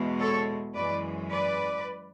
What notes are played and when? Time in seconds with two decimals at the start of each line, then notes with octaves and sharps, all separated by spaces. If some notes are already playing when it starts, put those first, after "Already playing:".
Already playing: E2 B2 G#3
0.19 A4 C#5
0.74 F#2 E3 G#3 B4 D5
1.30 B4 D5